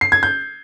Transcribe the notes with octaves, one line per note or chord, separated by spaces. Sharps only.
C7
G#6
G6